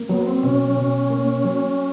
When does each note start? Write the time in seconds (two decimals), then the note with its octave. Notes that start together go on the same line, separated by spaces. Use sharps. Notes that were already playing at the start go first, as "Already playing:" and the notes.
Already playing: A#3
0.09 F#3 B3
0.26 C4
0.43 B2 C#4
0.77 B2
1.10 A#3
1.44 F#3